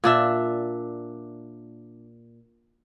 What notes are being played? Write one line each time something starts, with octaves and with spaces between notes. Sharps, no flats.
A#2 D4 E5